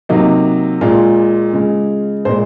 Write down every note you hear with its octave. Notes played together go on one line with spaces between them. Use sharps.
C3 F#3 A#3 D#4
A#2 G#3 F4
C#3 G#3
A#2 G#3 C5